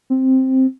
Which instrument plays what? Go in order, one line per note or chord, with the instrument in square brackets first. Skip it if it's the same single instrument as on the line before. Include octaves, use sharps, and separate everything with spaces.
[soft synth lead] C4